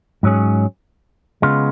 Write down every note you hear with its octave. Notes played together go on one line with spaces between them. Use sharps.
G#2 F#3 C#4 G#4
C#3 G#3 B3 F4